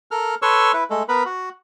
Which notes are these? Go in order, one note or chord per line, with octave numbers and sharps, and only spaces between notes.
A4 A#4 F6
A4 B4 C#5 C6 C#6 E6
E4 B4
G#3 A3 A4
B3 A#4 B4 B5
F#4